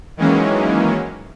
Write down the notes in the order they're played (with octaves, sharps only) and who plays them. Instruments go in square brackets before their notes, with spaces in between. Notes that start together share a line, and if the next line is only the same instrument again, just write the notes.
[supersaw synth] D#3 E3 F#3 G#3 A#3 C#4